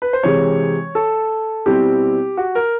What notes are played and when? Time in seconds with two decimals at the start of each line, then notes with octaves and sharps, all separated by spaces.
0.02 B4
0.13 C5
0.23 C3 E3 G#3 C#5
0.95 A4
1.66 B2 G3 C4 E4 G4
2.37 F#4
2.55 A#4